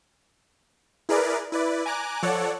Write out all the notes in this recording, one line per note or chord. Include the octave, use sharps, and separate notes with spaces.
E4 G#4 A#4 B4 D5
E4 B4 D5
G#5 A#5 D6 F#6
F3 A4 C#5 D5 F#5